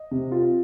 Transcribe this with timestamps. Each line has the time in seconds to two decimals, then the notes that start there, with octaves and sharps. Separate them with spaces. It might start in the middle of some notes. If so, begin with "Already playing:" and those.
Already playing: D#5
0.11 C3
0.32 F4